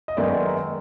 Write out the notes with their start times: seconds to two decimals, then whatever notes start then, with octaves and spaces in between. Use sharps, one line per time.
0.08 D#5
0.17 F#2 D#3 G#3 B3 D5 E5